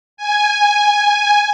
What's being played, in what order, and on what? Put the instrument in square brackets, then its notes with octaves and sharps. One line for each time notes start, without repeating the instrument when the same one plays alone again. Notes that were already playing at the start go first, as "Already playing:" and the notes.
[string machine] G#5